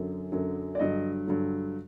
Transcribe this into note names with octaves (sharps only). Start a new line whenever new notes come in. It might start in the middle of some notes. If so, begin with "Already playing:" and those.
Already playing: F#2 D3 F#3
F#2 D3 F#3
D5
G2 D3 F#3 D#5
G2 D3 F#3